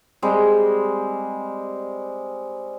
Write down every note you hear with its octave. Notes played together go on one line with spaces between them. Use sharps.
G3 G#3 C4